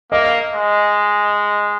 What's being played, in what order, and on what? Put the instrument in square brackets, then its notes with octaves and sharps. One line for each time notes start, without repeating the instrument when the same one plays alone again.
[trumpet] A#3 [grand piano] D#5
[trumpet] G#3